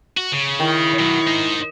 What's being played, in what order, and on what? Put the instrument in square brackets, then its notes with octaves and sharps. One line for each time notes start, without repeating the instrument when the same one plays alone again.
[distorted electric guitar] F#4
C#3
[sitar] D#3 [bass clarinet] E4
[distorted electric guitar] B2 F#3
D#4 C5